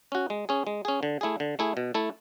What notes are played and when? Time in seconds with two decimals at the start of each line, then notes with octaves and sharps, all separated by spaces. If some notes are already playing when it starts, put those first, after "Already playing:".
0.12 C#4 F#4
0.30 G#3
0.49 C#4 G#4
0.67 G#3
0.85 C#4 G#4
1.03 D3
1.21 A3 E4 G#4
1.40 D3
1.59 A3 E4 G#4
1.77 B2
1.94 A3 E4 A4